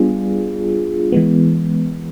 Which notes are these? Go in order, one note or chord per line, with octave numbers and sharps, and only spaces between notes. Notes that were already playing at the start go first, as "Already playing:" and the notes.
Already playing: G3 B3 D4 F4 G#4
E3 G#3 B3